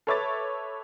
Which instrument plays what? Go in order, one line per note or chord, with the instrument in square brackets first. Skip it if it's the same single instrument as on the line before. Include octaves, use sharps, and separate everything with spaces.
[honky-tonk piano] A4 B4 C#5 E5 D6 A6